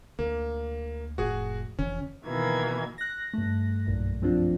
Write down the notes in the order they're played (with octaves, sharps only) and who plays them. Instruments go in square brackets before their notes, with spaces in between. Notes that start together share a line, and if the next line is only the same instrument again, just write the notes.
[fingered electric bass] D2 [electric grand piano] A#3
[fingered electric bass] F1 A2 [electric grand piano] F#4 G#4
[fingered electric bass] F1 D3 E3 [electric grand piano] C#4
[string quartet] B2 D#3 E3 A#3 G#6
[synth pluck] F#6 A#6
G2 A3
B1 F#2 A#2
F3 C4 D4 F4